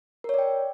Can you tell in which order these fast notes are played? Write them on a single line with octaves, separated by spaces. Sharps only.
A#4 C#5 D5 G5